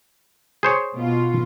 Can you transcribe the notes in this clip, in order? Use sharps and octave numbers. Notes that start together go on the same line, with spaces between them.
G#4 C5 C#5
B2 F4